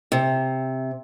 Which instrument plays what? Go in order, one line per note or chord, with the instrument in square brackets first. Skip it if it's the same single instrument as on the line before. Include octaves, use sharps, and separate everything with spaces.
[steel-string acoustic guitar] C3